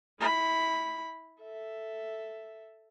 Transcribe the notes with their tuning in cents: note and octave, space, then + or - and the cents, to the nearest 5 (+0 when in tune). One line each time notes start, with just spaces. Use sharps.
E4 -25 B5 +0
A4 +0 E5 +0